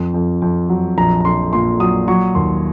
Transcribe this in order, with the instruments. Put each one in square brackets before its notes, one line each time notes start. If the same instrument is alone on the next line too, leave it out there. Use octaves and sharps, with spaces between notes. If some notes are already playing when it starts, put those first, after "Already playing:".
Already playing: [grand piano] F2
F2
F2
F#3
A#1 A#5
A#5
A#1 C6
A#2 C6
F#3 D#6
F#3 C#6
D#2 C6